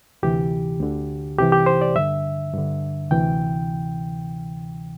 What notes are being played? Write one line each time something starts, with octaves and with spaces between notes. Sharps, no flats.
D2 C3 E3 G4
D2 D3
C2 C3 E3 G4
G4
C5
D5
G2 D3 E5
G2 D3
D2 C3 E3 G5